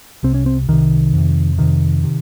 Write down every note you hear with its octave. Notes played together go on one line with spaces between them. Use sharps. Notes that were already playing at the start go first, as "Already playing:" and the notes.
C2 C3 C4
C#4
C4
C2 C3 D#3
F2 C3
F2 C3 D#3
C3